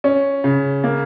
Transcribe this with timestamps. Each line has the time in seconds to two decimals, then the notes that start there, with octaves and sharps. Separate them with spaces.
0.04 C#4
0.44 C#3
0.84 A#3